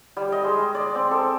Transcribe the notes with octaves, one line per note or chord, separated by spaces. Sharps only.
G3
D#5
G#3
D5
C4
A4